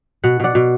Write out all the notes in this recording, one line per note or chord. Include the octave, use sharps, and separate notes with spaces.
B2 F#5
B2 D5 F#5
B2